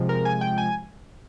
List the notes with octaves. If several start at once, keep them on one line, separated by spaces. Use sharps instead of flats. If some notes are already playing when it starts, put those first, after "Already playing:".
Already playing: C3 F3 G#3
A#4
G#5
G5
G#5